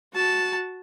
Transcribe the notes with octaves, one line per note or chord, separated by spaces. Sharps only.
F#4 A5